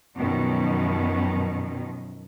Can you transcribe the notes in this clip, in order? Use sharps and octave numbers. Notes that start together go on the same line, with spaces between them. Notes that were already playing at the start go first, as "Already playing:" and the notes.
F#2 B2 D#3 F3